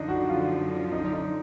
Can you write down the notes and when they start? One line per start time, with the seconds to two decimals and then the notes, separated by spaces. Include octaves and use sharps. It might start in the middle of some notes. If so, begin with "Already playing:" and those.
Already playing: F#2 D3 F3 D4 D#4 D5 D#5
0.08 F#4 F#5
0.29 F4 F5
0.92 D#4 D#5
1.04 D5
1.13 D#4 D#5